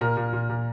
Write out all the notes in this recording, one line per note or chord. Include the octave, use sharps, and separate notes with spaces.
A#2 A#4
A#2
A#2
A#2